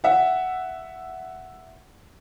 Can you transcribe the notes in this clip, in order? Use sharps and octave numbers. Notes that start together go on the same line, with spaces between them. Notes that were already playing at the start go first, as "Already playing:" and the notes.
E5 F#5